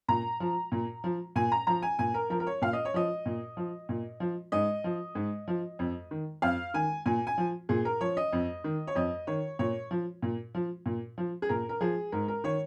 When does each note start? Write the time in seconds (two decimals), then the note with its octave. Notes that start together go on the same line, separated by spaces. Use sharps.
0.08 A#2 A#5
0.40 F3
0.72 A#2
1.04 F3
1.36 A#2 G#5
1.52 A#5
1.67 F3 A#5
1.82 G#5
1.99 A#2 G#5
2.14 A#4
2.30 F3 A#4
2.40 A#4
2.47 C#5
2.62 A#2 F5
2.73 D#5
2.85 C#5
2.94 F3 D#5
3.26 A#2
3.57 F3
3.89 A#2
4.20 F3
4.52 G#2 D#5
4.84 F3
5.15 G#2
5.48 F3
5.79 F2
6.11 D#3
6.42 F2 F5
6.74 D#3 G#5
7.06 A#2 G#5
7.27 G#5
7.38 F3
7.69 A#2 G#4
7.85 A#4
8.01 F3 C#5
8.17 D#5
8.33 F2
8.64 D#3
8.87 C#5
8.95 F2 D#5
9.27 D#3 C#5
9.59 A#2 C#5
9.91 F3
10.23 A#2
10.55 F3
10.86 A#2
11.18 F3
11.42 G#4
11.49 A#2 A#4
11.69 A#4
11.81 F3 G#4
12.12 G#2 A#4
12.28 A#4
12.44 D#3 C#5